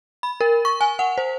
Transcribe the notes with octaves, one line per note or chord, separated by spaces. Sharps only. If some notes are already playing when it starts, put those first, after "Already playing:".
B5
A#4
C#6
G#5
F#5
C5